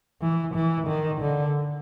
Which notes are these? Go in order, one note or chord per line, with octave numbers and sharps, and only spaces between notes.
E3
E3
D#3
D3